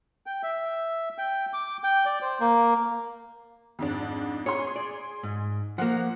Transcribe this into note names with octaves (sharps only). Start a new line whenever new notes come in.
G5
E5
G5
D6
G5
D5
C5
A#3
F2 G#2 D4
G#4 C#5 C6
D5
G#2
F3 A#3 F#5